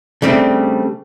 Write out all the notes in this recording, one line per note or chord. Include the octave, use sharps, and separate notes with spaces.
C#3 G3 A3 C4 D4